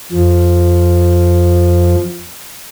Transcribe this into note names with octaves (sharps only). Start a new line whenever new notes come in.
F2 F3